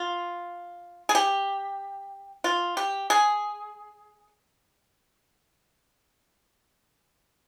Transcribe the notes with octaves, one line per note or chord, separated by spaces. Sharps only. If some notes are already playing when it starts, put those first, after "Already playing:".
Already playing: F4
G#4
G4
F4
G4
G#4